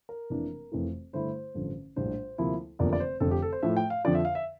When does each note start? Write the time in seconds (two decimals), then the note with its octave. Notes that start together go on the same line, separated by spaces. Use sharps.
0.09 A#4
0.30 F1 F2 E3 A#3 D4
0.72 F1 F2 E3 A3
1.13 G2 D3 A3 E4 C5
1.55 A1 G2 D3 F3
1.96 A#1 A2 G3 D4 C5
2.38 D2 C3 F3 A#3 E4
2.79 F1 E2 D3 F3 A#3 D5
2.93 D5
3.00 C5
3.20 F1 F2 D3 A4
3.31 G4
3.42 A4
3.52 C5
3.62 A2 F3 A3 E5
3.77 G5
3.90 F5
4.05 F2 D3 F3 D5
4.15 E5
4.25 F5
4.35 E5